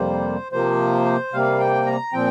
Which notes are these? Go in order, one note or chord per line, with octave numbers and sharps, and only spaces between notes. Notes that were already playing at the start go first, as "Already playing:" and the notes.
Already playing: F2 C3 G3 A#3 C5
C3 F3 A#3 C5
C3 G3 A#3 F5
G5
A#5
A#2 F3 C4 G5